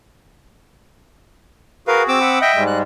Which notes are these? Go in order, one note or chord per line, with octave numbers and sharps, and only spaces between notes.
F#4 G#4 A#4 B4 F5
C4 D6 E6
F#5 B5 D#6
D#5 E5 G5
G#2 G3 G#3
F#6